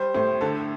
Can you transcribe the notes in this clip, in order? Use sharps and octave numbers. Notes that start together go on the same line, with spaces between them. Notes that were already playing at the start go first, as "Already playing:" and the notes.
Already playing: G3 C5
A2 C5
D3 A4